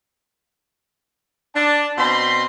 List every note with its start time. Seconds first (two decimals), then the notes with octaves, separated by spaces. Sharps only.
1.54 D4 A5
1.97 B2 C4 B5 C6